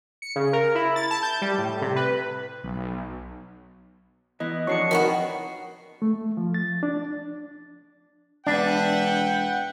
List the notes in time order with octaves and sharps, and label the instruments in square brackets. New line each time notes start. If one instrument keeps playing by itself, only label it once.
[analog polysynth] C#7
C#3
A#4
E4
A6
A5
G6
G3
A2
C3
B4
[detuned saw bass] B1
[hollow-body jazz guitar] E3 B3 [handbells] D#5
[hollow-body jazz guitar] F2 D4 [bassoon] F#3 [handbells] C#6 C7 C#7
[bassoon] D#3 [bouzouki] B3 E4 F#4
[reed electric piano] A3
F3
A6
D4
[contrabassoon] E1 [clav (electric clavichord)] D4 [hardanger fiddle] B4 E5 [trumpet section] F#5 G5